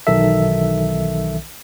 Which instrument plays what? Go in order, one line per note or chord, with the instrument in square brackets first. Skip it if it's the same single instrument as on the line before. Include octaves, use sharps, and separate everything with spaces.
[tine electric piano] B1 D#3 E3 A4 E5